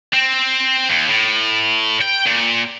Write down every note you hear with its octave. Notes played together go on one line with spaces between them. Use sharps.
C4
D#2
A2
G5
A#2